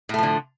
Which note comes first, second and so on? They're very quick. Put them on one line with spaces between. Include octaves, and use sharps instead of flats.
A2 A3 F3 D3